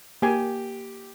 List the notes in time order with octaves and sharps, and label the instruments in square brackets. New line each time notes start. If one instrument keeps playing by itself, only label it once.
[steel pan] A#3 G#5 [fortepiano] G4